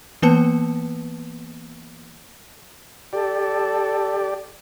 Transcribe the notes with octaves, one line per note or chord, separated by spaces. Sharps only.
E3 A#3 B3 B4 A5 C#7
G4 A4 D5